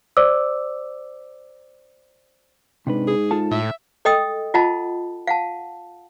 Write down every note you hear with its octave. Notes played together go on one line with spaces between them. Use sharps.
C5 D5 D6 E6
G#2 C3 D4 B4
G#4
F4 A4 A5
A2 E5
A4 D#5 G5 D#6 E6
F4 D#5 F#5 A5 B5
F5 F#5 A5